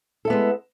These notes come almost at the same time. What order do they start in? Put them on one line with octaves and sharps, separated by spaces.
A4 E4 B3 G#3